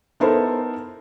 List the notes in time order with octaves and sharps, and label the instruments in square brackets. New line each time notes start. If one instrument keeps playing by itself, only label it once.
[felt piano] B3 D#4 E4 A4 A#4 C5